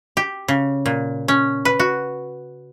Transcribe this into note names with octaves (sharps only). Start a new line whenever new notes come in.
G4
C#3
A#2
C#4
B4
F#4